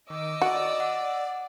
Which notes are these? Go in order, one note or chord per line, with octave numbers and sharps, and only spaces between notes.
D#3 D#5 D6 E6
F#4 D5
F#5